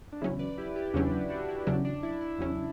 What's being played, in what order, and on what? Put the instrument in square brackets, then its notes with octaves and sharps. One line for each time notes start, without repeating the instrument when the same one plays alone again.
[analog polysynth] D4
[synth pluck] E2 C#3 F#3 C#4 [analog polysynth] E4
[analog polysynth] B4 D5
E4 G4
E4 G4
[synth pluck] E2 C#3 F#3 C#4 [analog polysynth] D4 F#4
[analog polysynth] E4
D4 F#4
E4
[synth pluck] E2 C#3 F#3 C#4 [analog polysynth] D4
[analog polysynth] D4
E4
E4
[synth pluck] E2 C#3 F#3 C#4